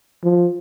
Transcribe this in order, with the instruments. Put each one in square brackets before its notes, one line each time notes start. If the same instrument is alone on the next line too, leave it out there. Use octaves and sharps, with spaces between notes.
[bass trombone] F3